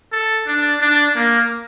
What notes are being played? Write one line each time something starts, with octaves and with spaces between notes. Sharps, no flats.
A4
D4
D4
A#3